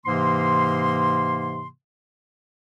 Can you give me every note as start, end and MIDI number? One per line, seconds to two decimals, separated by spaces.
0.06 1.68 44
0.06 1.68 48
0.06 1.68 52
0.06 1.68 58
0.06 1.68 84